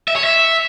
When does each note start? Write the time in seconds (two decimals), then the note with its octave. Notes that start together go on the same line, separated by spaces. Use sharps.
0.08 E5
0.16 C#5
0.24 E5